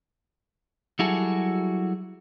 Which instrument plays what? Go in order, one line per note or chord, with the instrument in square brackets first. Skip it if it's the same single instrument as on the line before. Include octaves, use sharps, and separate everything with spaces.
[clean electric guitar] F#3 G3 E4 F#4 G#4 A4